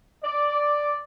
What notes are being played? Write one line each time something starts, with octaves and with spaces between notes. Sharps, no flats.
D5